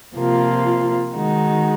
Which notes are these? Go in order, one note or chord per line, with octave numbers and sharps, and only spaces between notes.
C3 F3 A#3 F4
D#3 G#3 D#4 F#4